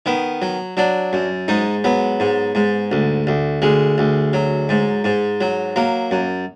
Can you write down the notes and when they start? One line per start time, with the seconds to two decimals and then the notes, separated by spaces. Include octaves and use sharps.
0.06 D#3 B3
0.42 F#3
0.77 F#3 D4
1.13 F#2
1.48 G#2 D#4
1.84 F#3 B3
2.20 G#2
2.55 G#2
2.92 D2
3.27 D2
3.62 D2 G#3
3.98 D2
4.33 F#3
4.69 G#2
5.04 G#2
5.41 F#3
5.76 F#3 A#3
6.11 F#2